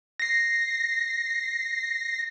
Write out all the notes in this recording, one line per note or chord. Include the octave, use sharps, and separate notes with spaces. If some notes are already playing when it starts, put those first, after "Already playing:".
A#6 C7